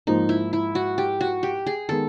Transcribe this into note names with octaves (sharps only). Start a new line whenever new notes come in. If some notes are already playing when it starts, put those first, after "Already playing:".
G#2 F3 A#3 D#4
E4
E4
F#4
G4
F#4
G4
G#4
D#3 G#3 B3 A4